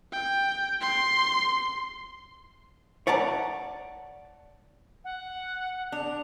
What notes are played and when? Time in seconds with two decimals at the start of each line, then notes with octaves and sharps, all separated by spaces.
0.12 G5
0.81 C6
3.07 C#5 D5 F#5 A5 A#5
5.04 F#5
5.92 D4 F7